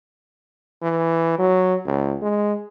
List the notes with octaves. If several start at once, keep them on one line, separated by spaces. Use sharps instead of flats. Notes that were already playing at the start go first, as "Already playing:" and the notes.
E3
F#3
C#2
G#3